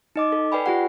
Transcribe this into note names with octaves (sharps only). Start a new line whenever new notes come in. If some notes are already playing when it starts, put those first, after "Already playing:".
D#4 D#5 D6
A4
B4 D5 G5 G#5 B5
F4 G4 F#5